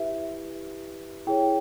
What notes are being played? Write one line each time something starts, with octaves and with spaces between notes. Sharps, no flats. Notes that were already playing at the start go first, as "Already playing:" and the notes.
Already playing: E4 G4 B4 E5
E4 G#4 C#5 G5